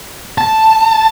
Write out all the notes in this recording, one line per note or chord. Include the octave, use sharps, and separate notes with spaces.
A5